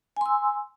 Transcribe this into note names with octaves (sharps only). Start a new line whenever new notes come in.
G#5 C6 E6